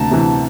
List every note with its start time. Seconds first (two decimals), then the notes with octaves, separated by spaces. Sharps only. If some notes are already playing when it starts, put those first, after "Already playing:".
Already playing: D2 C3 A5 A#5
0.11 C3 E3